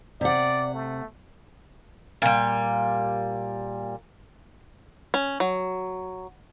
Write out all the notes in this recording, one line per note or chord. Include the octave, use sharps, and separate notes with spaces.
C3 D5 F#5
A3
A#2 G3
C#4
F#3